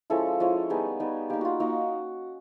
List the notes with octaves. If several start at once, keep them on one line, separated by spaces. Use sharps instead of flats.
F3 G#3 C#4 E4 A4
F3 G#3 C#4 E4
G3 B3 D#4 G#4
G3 B3 D#4
A#3 D#4 G4
F4 F#4
A#3 D#4 F#4